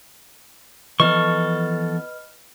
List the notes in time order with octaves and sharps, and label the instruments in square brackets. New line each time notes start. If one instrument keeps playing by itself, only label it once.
[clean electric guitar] E3 F3 B3 [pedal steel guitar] A4 C#6 [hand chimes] B4 D#5 F6